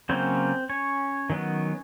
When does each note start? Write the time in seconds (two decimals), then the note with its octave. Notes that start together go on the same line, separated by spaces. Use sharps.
0.09 C#3 F#3 A#3 C4 C#4 C5
0.69 C#4 C#5
1.30 D#3 F#3 B3